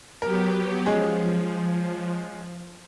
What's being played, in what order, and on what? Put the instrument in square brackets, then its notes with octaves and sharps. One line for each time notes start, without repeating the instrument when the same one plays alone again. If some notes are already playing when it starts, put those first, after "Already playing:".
[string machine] F#3 B3 G4 [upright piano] A#4
[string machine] F3 [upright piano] G#3 C#4 G#4